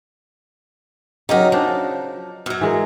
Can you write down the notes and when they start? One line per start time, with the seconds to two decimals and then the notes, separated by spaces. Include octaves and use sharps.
1.29 C#3 F#3 D#4 G4 A#4
1.52 F3 D4 D#4
2.46 F#2 F#3
2.61 E3 G#3 A#4